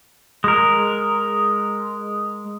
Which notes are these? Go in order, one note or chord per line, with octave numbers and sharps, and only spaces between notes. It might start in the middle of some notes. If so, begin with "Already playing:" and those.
G#3 A#4